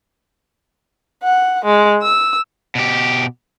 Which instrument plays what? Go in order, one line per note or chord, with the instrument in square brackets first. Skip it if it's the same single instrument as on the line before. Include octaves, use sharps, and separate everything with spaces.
[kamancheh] F#5
G#3
E6
[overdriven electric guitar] B2 G4